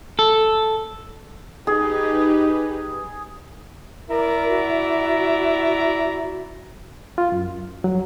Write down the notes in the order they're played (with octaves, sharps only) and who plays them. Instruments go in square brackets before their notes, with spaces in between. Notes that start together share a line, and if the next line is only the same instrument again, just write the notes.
[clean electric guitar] A4
[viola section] D#4 G4 B4 [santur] G#4
[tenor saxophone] E4 [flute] A#4 [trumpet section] D5 A#5
[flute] F#4
[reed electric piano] F4
F#2
F#3